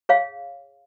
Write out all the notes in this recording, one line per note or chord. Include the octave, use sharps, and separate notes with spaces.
G#4 C#5 F5